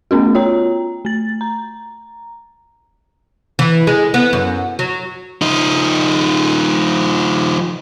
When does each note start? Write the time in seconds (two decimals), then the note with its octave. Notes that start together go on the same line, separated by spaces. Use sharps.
0.11 A3 B3 C#4 F#4
0.35 F4 C#5 G5 A#5
1.05 A3 A6
1.41 A#5
3.59 E3
3.87 G#3
4.14 B3
4.33 F#2
4.79 F#3
5.42 F3 D#4